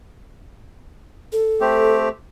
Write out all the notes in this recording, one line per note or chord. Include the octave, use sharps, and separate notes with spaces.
A4
A3 C4 G4